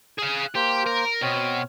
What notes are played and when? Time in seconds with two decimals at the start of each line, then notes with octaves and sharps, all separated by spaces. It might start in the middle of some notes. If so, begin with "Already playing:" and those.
0.19 G#4 F5
0.36 F#6
0.55 A#3 G4 C5
0.87 A#4
1.22 B2 C4 C#5 F6